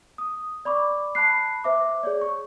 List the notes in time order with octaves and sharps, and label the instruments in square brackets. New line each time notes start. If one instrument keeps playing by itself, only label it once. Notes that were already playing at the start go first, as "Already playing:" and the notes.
[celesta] D#6
D5 B5 C#6 D6
A5 B5 F#6 C7
C5 E5 D6
G#4 C#5 D5
C#6